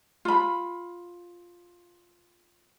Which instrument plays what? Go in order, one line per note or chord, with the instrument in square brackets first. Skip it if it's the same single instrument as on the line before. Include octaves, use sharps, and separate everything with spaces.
[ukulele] F4 B5